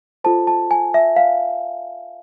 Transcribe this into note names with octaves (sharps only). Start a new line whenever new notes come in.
F4 A4 C5 A5
A5
G#5
E5
F5